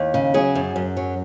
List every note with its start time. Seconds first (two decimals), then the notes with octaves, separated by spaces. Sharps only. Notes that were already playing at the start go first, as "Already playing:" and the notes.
Already playing: D#2
0.14 C#3
0.34 F#3 G#4
0.55 F#2
0.76 F#2
0.97 F#3